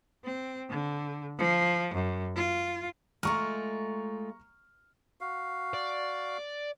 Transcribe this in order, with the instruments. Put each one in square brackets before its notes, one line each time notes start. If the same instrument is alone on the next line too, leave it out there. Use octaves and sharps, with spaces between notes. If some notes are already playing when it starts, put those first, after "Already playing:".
[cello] C4
D3
F3
F#2
F4
[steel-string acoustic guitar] G#3 A3 F4 [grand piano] A#5 C#6 F6
[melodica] F#4 F5
[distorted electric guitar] D5